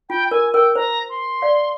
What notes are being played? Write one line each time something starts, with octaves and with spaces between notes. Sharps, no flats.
F4 G5
A#4 G#5
A#4 G5
C5 A#5
C6
D5 F5